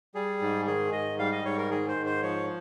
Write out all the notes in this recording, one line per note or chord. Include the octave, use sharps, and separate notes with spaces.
G3 G#4
G#2
D#3 G#4
G#2 D#5
G3 F5
D#5
G#2 C#5
A#4
D#3 G#4
C5
G#2
C5
F3 C#5